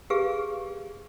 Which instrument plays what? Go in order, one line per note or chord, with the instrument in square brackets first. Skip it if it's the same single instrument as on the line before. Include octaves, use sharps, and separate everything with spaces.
[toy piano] G4 G#4 B4 F5